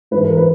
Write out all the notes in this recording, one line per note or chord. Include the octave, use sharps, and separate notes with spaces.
G#2 E3 B4
A#4
B4